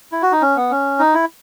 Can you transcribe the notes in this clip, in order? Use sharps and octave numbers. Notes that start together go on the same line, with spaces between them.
E4
F#4
D#4
C#4
B3
C#4
D#4
E4